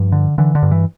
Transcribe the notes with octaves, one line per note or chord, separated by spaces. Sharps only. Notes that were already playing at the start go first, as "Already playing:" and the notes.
Already playing: G2 F3
D3
D3 E3
D3
G2
E3